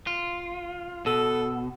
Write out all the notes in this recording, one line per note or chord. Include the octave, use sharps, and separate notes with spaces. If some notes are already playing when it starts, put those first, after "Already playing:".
F4
B2 A4